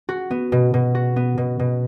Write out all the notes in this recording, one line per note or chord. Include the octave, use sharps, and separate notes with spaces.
F#4
B3
B2
B2
F#4
B3
B2
B2